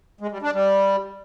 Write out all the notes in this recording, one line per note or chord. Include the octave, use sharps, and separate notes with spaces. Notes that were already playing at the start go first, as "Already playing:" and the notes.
G#3
G3
D4
G3